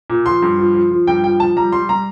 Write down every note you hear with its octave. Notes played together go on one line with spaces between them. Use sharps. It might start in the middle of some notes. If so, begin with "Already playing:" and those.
A#2
F3 C6
G2
F3
F3
F3
G2 G5
F3 G5
F3 A5
G3 A#5
G3 C6
G3 A#5